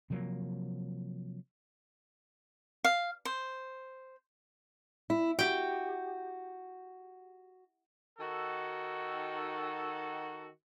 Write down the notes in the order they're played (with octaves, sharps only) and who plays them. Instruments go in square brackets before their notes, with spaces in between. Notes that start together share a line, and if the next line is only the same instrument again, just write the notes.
[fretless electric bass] C3 F3 F#3 A#3
[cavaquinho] F5
C5
[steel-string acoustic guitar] E4
[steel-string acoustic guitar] F#4 [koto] G4 G5
[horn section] D#3 F#4 A4